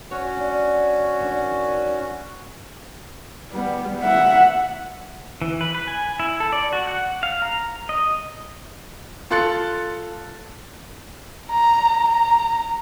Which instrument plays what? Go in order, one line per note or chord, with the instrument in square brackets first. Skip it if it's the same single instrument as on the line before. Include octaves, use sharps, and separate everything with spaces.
[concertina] C#4 F#4 [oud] C#5
[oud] D4
D#3 D4
[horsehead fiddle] G3 B3
E5 F#5
[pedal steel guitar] E3
B4
B4
G#5
E4
A4
D5
F#4
F#5
F5
A#5
D#5
[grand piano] F4 A4 C6 F#6 A6 C#7
[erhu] A#5
A#5